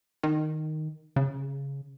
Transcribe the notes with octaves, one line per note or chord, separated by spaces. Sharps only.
D#3
C#3